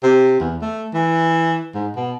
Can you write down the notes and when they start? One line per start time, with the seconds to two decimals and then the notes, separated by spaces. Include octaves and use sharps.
0.03 C3
0.40 E2
0.61 A3
0.94 E3
1.74 G#2
1.96 B2